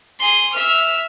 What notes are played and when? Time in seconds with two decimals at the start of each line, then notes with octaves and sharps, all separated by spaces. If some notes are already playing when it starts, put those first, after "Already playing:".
0.19 G#4 C6
0.52 E5 F6